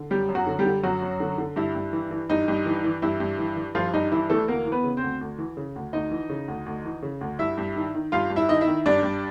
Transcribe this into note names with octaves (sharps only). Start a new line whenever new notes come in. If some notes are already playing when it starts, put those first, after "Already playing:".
Already playing: D3
F#2 G3 G4
F#2
F#3 F#4
D3
G3 G4
D3
F#2 F#3 F#4
F#2
D3
D3
G2 E4
G2
E3
E3
G2 D#4
G2
E3
E3
G2 E4
G2
E3
E3
G2 F3 F4
G2 D#4
E3 E4
E3 A3 A4
D2 A#3 A#4
E3
B3 B4
C#3
C4 C5
D2
D2
E3
C#3
D2
D2 D#4 D#5
E3
C#3
D2
D2
E3
C#3
D2
G2 E4 E5
G2
D#3
D#3
G2 F4 F5
G2
E4 E5
D#3 D#5
E4 E5
D#3
G2 D4 D5
G2